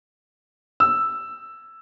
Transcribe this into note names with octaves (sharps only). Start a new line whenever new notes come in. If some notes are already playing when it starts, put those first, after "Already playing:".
E6